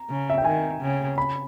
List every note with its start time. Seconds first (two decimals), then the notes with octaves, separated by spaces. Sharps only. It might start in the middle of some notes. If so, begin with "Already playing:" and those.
Already playing: A#5
0.09 C#3
0.30 E5
0.38 G5
0.45 D#3 G#5
0.81 C#3
1.18 B5